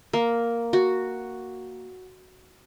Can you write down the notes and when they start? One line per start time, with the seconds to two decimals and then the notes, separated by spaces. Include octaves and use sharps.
0.13 A#3
0.73 F#4